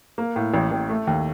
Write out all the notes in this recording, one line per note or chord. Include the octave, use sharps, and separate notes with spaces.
A#3
A2
A1
A1
A3
D#2